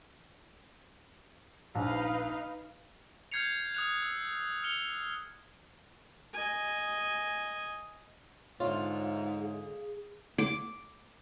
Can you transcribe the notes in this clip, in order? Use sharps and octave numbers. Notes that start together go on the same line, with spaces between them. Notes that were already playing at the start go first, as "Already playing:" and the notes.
A#1 D#4 B4 F5
F6 G6 G#6 C7 C#7 F7
D#6 F#6 F7
E6
F6 C#7 F7 G7
D#5 G#5
G#2 D3 F4 C#5 D#5 E5
G#4
D6